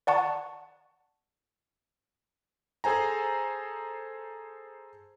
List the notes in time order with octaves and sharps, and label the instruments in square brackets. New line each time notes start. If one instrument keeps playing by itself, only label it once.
[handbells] D5 F#5 A5 C#6
[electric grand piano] G#4 A4 C5 G#5 A#5